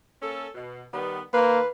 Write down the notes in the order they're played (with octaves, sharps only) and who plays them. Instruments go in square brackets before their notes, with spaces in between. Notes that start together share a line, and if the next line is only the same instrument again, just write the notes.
[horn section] A#3 C#4 A4
B2
D#3 G3 B3
[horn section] D#3 C5 F5 [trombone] A#3 [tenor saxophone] B4